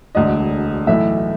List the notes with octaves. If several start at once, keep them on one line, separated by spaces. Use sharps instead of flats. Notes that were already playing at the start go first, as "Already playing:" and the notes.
E1 D2 D3 D#5
B1 A2 E3 A3 E5